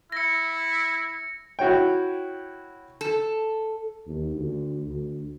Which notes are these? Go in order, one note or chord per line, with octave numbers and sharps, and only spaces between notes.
E4 A#6 C#7
E4 F#4 C#5 G5
A4
D#2
D2
D2